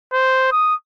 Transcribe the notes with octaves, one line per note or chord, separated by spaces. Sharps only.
C5
D#6